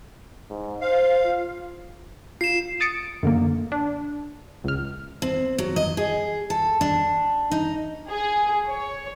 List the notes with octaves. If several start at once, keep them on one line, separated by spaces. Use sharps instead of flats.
G#2
C5 F5
F4
F4 C7 E7
D#6 A6 C#7 D7
F#2 D3 A#3
D4
C#2 F6
C4
F#3
D#5
G#4
A4
D4
D#4
G#4
C#5